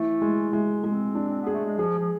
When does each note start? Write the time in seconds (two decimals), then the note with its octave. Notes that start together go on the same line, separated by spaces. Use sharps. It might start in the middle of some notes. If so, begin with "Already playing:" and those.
Already playing: E3 A3
0.22 G#3
0.53 G#3
0.84 G#3 C4
1.15 D4
1.28 C4
1.42 B3
1.47 G#4
1.53 A3
1.65 G#3
1.78 F3 G#4
1.99 F3